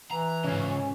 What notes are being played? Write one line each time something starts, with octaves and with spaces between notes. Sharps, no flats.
E3 A#5
G#2 C#3 C#4 F4